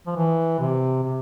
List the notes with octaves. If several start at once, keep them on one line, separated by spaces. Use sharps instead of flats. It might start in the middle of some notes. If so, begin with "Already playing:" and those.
F3
E3
C3
C3